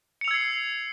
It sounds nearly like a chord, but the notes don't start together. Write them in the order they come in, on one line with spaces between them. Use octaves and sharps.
C#7 F7 E6 G#6 C7